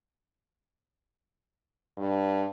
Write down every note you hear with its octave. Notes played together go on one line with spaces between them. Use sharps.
G2